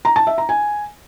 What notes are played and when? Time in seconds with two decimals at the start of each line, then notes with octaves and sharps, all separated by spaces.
0.05 A#5
0.16 A5
0.27 E5
0.38 A#5
0.49 G#5